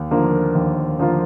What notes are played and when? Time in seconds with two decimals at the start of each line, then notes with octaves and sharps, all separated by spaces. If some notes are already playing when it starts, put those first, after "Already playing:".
Already playing: D#2
0.11 D3 F3 A#3 F4
0.55 D#2
0.99 D3 F3 A#3 F4